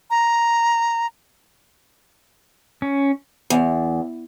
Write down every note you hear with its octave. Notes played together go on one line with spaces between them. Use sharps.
A#5
C#4
E2